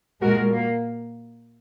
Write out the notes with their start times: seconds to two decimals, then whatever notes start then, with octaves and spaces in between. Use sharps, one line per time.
0.21 A#2 G#3 F#4 A#4
0.53 A#3